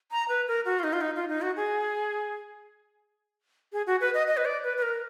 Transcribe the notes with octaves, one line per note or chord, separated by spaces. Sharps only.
A#5
B4
A#4
F#4
F4
D#4
F4
D#4
F4
D#4
F#4
G#4
G#4
F#4
B4
D#5
D#5
B4
D5
B4
B4
A#4